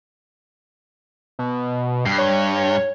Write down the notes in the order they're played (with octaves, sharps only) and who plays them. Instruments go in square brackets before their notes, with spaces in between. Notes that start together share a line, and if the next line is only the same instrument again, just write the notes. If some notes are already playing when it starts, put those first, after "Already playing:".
[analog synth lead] B2
[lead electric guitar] G2 [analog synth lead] C7
[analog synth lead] C#5